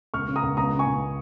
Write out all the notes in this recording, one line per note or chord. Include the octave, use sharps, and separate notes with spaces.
C#2 C#6 F6
C#3
A#5 D#6
C#2
C#2 A#5 D#6
C#3
G#5 C#6
C#2